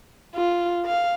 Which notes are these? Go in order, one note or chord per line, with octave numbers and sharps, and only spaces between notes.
F4
F5